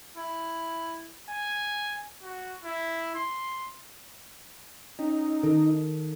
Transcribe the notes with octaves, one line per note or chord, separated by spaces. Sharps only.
E4
G#5
F#4
E4
C6
C#4 D#4
D#3 A4